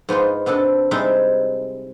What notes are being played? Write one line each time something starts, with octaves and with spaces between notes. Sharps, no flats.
G#2 B3 D#4 F4
C3 B3 D4 A4
C3 G3 G#3 D#4 E4 B5